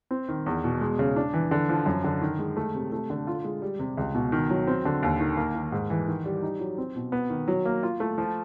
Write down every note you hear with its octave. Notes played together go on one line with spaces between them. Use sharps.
C4
D#3
E2
B2
G#3
C#3
D4
E3
D3
F3
F#2
D3
D#3
G#3
A3
C3
A3
D3
F4
G#3
G3
C3
C#2
B2
D#3
F#3
C4
D3
D#2
D#3
A#3
D#3
G#2
E3
D#3
G3
D#4
F#3
C4
B2
B3
D#3
F#3
A#3
F4
A3
F3